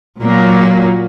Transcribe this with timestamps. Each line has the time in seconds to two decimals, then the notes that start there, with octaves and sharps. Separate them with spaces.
0.21 A#2 F#3 A#3